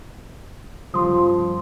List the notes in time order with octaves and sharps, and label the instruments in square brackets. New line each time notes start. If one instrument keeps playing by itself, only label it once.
[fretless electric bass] G1 C#3 G3 [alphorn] F3 [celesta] C6 D#6